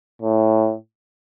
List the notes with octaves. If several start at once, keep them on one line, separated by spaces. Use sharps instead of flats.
A2